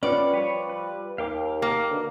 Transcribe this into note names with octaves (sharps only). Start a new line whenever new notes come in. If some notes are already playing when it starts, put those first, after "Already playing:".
B3 C#4 F4 G4 B4 D5 F#5
F3 G3 B4 C#5
B4
D#2 F5 G5 D6
A#3
B2 D3